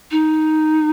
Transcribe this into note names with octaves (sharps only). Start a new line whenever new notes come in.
D#4